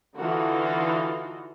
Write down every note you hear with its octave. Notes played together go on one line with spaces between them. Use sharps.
D3 E3 D#4 F4 F#4